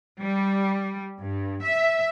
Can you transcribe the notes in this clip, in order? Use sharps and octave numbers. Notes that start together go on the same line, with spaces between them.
G3
G2
E5